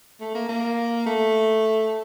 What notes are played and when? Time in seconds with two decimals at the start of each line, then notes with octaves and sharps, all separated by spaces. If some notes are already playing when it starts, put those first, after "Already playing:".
0.20 A3
0.35 A#3
0.48 A#3
1.06 A3